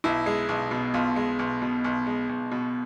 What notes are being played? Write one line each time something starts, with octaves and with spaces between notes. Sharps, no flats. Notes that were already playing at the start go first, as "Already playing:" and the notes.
B1 E4
G#3
B1
B2
B1 F4
G#3
B1
B2
B1
G#3
B1
B2